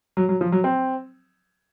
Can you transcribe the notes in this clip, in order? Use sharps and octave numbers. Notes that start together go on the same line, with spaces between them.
F#3
F#3
F3
F#3
C4